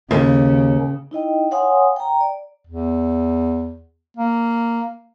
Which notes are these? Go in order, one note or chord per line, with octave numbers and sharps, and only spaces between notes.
D#2 C#3
D#4 E4 D#5 G5
C#5 F5 F#5 G#5 C6 D#6
G5 A#5
D5
E2
A#3